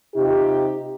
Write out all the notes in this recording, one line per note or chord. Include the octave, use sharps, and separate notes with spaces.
C3 D#4 F4 G4